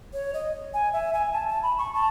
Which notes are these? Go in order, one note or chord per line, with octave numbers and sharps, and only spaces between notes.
C#5
D#5
G#5
E5
G#5
A5
A5
B5
C#6
A5